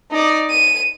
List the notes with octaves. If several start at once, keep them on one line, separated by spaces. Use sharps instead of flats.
D#4 D5
D#7